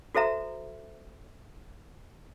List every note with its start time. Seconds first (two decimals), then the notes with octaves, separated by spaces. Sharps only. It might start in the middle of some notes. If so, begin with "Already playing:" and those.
0.15 F#4 A4 C5 E5 A#5